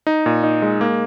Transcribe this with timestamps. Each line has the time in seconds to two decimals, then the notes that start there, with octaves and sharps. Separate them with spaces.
0.07 D#4
0.26 A#2
0.44 D#4
0.62 G#3
0.81 A#3